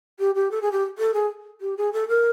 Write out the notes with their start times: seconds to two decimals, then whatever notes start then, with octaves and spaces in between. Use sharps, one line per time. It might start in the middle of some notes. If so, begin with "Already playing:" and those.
0.19 G4
0.35 G4
0.51 A4
0.62 G#4
0.72 G4
0.98 A4
1.14 G#4
1.61 G4
1.77 G#4
1.93 A4
2.08 A#4